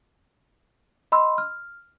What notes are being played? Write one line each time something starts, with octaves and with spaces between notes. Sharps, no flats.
D#5 B5 C6 E6
F6